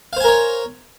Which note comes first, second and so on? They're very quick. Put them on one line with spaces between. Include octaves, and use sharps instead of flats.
F5 C5 G#5 A#4 C#5